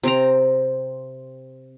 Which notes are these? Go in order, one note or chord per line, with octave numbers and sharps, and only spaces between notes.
C3 C4 A#5